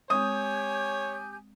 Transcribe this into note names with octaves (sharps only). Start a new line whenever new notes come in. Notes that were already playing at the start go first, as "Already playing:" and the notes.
G#3 C4 G4 C#5 G#5 D#6 G6